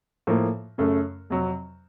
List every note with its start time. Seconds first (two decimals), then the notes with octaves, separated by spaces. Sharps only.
0.27 A2 F3 A#3
0.78 F#2 C#3 A3
1.30 F2 C3 F#3